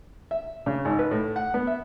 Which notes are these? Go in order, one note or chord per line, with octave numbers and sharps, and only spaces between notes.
E5
C#3
G#1
B4
A2
F#5
B3
E5